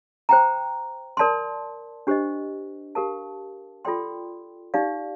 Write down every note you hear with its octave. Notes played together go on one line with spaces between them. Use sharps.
C5 G5 A#5
A#4 D5 A5 C6
D4 G4 C5 D#5
G4 A#4 F5 A5
F4 A4 D5 G5 C6
D#4 G4 D5 F5